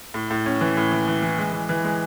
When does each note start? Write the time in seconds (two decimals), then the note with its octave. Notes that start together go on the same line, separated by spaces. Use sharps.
0.14 A2
0.31 A2
0.46 C#4
0.61 E3
0.77 A2
0.92 E3
1.08 E3
1.22 E3
1.38 G#3
1.53 E3
1.69 E3
1.84 G#3